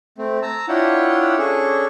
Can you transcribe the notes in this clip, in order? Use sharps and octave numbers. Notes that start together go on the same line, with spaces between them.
A3 C4
A5 A#5 E6
D4 E4 F4 C#5 F#5 G5
C#4 D4 G#4 A4 C#6